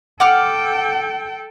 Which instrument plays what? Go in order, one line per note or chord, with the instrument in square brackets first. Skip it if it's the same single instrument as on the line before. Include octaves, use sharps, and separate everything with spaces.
[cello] A4 G5 [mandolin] F#5 D6 F6